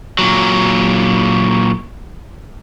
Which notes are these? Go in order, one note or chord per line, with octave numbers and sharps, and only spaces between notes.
A#2 F#3